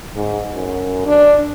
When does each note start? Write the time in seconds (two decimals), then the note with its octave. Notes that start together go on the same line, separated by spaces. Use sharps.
0.16 G#2
0.55 F#2
1.07 D4